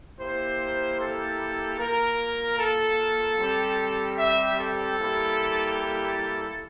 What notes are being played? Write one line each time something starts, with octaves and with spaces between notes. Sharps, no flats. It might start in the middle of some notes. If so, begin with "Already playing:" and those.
A#3 E4 G4 C5
A4
A#3 F4 A#4
A4
G3 C4 G4
E5
A4
G3 A#3 E4 G4
A4